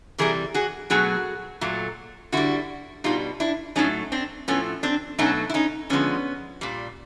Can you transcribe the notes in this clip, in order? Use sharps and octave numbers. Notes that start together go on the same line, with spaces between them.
C3 E3 G3 G#4 A#4
F#4 G#4
B2 F#3 A3 F#4 G#4
A#2 F#3 A3
D3 G3 E4 F#4
B2 G3 D#4 F4
D4 E4
A2 F#3 A3 C#4 D#4
C4 D4
A2 F3 A3 B3 C#4
C4 D4
B2 F#3 A3 C#4 D#4
E4
C#4 D#4
D3 F3 G#3 B3 C#4
A#2 G3